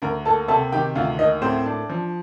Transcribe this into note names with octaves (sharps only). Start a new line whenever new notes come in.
D2 A#4 A#5
A#3 A4 A5
C3 A4 A5
D#3 G4 G5
D2 F4 F5
A#3 D#4 D#5
A2 C4 C5
D4
F3